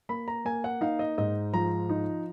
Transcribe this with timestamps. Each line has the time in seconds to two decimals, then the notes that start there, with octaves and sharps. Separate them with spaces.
0.09 A#3 B5
0.28 A#5
0.45 A#3 G#5
0.64 F#5
0.81 D#4 F5
0.99 D#5
1.18 G#2 D#5
1.53 F3 A#5
1.89 D#4